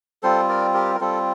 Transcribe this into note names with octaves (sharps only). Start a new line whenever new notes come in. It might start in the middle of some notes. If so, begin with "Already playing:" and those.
G3 C4 F4 A4 C5
A#4 D5
G4 A#4
A#4
G3 C4 F4 A4